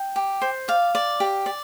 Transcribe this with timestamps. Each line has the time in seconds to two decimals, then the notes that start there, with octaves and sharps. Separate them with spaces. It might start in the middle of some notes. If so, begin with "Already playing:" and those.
Already playing: G5
0.16 G4
0.42 C5
0.68 D5 F5
0.95 D5
1.20 G4
1.46 D5